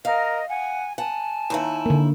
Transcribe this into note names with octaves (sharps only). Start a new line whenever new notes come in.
A#4 D#5 F5
F#5 G#5
F#5 G#5 A5
D#2 D#3 E4
D3 A#3